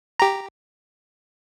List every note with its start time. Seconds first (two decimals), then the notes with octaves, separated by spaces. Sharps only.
0.20 G4 A#5